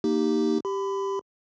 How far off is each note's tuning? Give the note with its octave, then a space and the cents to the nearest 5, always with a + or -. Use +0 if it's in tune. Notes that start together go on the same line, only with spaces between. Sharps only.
A#3 +0 D#4 +0 G4 +0
G4 +0 B5 +30